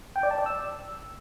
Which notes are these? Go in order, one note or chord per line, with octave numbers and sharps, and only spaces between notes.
G5
D5
A5
D5
E6